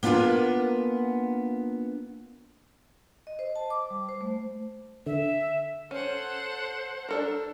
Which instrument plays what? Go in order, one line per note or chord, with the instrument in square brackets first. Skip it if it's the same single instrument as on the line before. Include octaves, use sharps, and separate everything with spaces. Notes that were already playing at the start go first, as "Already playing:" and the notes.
[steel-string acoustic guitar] A#3 B3 D4 F4 A#4 G#5
[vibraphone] D#5
C5
A5
D6
G3
C5
A3
[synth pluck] D3 [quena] E5
[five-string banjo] C#4 [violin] A4 F#5 [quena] C5
[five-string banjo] D4 A4 A#4